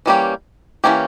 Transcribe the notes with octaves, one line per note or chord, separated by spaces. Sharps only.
E3 G3 A#3 C#4 G4
E3 G3 A#3 C#4 G4